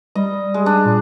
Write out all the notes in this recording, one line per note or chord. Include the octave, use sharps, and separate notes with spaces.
G3 D#5
G#3
D4
A#2